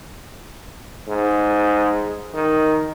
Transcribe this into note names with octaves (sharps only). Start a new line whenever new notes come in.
G#2
D#3